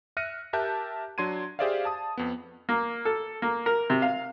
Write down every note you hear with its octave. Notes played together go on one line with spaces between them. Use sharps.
E5 F6 F#6 A#6 C#7 D#7
G4 A#4 E5 A5 F#6 G6
F#3 D4 C6 G#6 D#7
G4 G#4 C5 D5 E5 F5
A5 D#6
F2 B3
A#3
A4
A#3
A#4
C3
F5